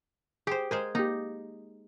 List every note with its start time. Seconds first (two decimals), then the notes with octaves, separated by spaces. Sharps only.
0.47 G4 G#4 C5
0.71 G#3 A#4 C5 G#5
0.95 A#3 D#4 G4